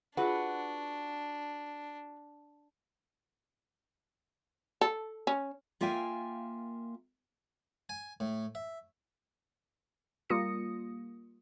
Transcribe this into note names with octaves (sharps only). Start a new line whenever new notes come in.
D4 F4 F#4 G#4 B4 F#5
A4
C#4
A#3 F4 E5 F5 G5 G#5
G#5
A2
E5
G3 A#3 F4 D#6 A#6 C#7